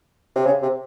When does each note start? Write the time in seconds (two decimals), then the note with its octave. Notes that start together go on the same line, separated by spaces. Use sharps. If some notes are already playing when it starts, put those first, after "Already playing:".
0.35 C3
0.46 C#3
0.62 C3